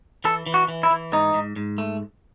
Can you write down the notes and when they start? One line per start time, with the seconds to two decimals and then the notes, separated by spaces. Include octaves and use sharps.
0.24 E3 A4
0.46 E3
0.54 F#4
0.68 E3
0.83 E4
0.91 E3
1.12 G#2 D#4
1.34 G#2
1.56 G#2
1.78 A3